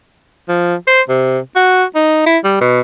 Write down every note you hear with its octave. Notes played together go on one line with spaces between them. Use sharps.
F3
C5
C3
F#4
D#4
E4
G3
B2